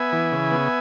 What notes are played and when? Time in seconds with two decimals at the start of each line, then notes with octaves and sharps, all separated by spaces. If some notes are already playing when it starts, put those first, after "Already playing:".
Already playing: B3 E5 G#5
0.12 E3
0.32 C#3
0.52 B3